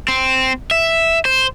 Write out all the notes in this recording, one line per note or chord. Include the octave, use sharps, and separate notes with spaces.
C4
E5
C5